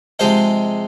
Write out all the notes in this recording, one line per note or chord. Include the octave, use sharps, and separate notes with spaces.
C3 F3 G#3 C5 D#5